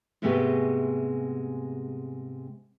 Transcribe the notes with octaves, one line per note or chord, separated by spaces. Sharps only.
G#2 C3 G#3 A3 B3 G4